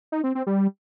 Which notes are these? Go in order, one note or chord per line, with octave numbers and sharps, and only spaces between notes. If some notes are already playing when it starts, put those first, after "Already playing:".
D#4
C4
C4
G3